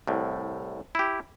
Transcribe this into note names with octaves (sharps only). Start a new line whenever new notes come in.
C2 A2
E4 G4